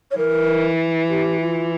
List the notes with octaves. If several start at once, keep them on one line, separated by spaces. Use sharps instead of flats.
C#5
E3 A#4
G4
F4